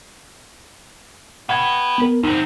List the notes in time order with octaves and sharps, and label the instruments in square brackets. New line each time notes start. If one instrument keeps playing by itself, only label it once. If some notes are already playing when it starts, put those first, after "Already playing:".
[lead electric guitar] F#4 B4 [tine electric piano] F#5 G5 G#6
[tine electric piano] B3 A#4
[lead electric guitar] E2 C4 [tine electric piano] D#4